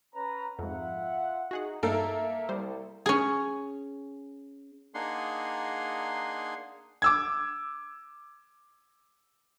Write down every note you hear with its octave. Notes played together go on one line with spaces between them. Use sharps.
C#4 B4 A#5
F2 G#2 F4 E5 F#5
D#4 F#4 G#4 F#5
G2 A#3 D#4 A4 A#4 E5
C2 G3 C5
C#4 G#4
A#3 D4 D#4 G#4 F#5 C6
D6 E6 G#6